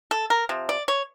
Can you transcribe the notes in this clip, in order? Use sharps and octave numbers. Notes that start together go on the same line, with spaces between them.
A4
A#4
C3 F3
D5
C#5